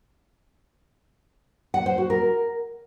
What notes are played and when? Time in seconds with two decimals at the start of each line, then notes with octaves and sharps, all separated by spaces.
1.74 F#5
1.86 C5
1.98 F#4
2.10 A#4